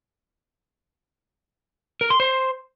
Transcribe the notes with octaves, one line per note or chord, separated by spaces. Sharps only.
A#4
C6
C5